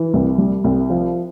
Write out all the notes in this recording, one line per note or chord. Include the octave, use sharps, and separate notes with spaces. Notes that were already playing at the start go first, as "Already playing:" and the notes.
Already playing: E3
C2
G3
C2
F3